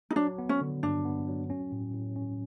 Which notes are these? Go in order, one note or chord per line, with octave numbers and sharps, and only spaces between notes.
D#4
F#3 D4
B3
C#4
D3
G2 D4
B3
F#3
C#4
A2
A2
C#4